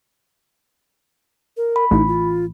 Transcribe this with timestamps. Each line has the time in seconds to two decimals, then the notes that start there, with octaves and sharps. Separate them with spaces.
1.57 A#4
1.76 B5
1.91 A1 D#4
2.07 F4